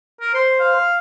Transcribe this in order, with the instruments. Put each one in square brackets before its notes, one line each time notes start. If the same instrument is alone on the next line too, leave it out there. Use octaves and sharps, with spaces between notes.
[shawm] A#4
[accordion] C5 [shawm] C6
[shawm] F5